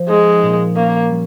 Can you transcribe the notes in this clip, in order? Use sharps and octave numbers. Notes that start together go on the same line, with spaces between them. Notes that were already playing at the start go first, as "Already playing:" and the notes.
Already playing: F3 C4
G#3 D#4
A#2
A#3 C#4
G3